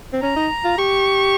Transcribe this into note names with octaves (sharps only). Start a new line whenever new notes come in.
C4
C#4 A#5
D#4
F4
G4 C#6